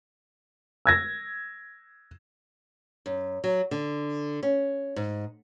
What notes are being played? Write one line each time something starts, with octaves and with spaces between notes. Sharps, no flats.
E6 G#6 A#6
F#2
F#3
D3
C#4
G#2